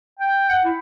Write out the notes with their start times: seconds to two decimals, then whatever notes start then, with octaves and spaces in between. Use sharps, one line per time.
0.19 G5
0.49 F#5
0.64 E4